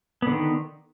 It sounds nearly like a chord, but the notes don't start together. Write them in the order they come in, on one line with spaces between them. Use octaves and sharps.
B3 D3 D#3